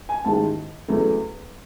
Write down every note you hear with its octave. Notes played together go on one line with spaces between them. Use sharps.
G#5
A1 G#2 D#3 G#3 A5
E2 C#3 F#3 A3